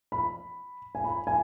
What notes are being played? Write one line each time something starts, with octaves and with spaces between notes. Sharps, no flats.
B5
G#5
B5
G#5